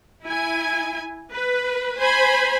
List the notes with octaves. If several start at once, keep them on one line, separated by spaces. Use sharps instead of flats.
E4 G#5
B4
C5 G#5 B5